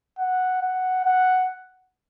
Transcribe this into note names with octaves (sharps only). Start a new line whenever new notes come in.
F#5
F#5
F#5